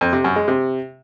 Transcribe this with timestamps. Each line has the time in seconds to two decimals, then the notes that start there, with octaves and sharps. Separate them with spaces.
0.01 F2
0.13 C3
0.24 F#2
0.36 G#3
0.48 C3